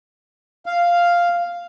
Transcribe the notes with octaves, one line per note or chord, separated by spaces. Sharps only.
F5